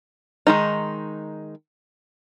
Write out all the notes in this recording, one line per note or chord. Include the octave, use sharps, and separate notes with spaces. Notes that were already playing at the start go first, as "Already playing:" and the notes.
D#3 G#3 D#4